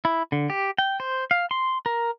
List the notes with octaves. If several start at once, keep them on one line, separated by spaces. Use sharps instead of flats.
E4
D3
G4
G5
C5
F5
C6
A#4